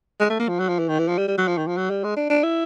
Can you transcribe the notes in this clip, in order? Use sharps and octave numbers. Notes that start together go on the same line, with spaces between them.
G#3
A3
A#3
F3
F#3
F3
E3
D#3
E3
F3
G3
G3
F#3
F3
D#3
F3
F#3
G3
G#3
D4
D4
E4